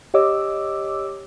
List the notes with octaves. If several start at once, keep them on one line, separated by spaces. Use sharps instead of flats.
G4 C#5 D#5 D6 E6